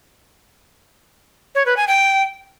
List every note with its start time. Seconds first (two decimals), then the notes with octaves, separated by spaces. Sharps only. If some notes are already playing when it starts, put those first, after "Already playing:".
1.55 C#5
1.66 B4
1.77 G#5
1.88 G5